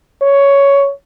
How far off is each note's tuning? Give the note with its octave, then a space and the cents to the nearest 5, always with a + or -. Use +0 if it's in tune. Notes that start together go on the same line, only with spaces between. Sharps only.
C#5 +10